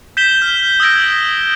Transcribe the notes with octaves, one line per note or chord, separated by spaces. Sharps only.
G6 B6 E7 G7
F6
D#6 E6 G#6 A#6 D7